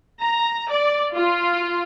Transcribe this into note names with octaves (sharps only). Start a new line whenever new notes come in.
A#5
D5
F4